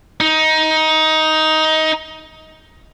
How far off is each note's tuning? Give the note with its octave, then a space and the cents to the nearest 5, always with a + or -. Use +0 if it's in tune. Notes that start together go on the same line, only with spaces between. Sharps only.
D#4 +15